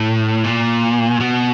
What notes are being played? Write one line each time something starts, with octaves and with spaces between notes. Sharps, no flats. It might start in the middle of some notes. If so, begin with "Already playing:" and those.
Already playing: A2
A#2
B2